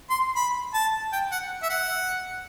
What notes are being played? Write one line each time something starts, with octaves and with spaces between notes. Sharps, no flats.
C6
B5
A5
G5
F#5
E5
F#5